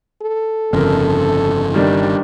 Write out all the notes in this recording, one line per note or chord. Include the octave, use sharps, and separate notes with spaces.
A4
G1 F2 C#3 A#4
D#3 G3 D4